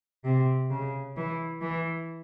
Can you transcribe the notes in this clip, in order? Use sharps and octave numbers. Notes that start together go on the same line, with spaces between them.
C3
C#3
E3
E3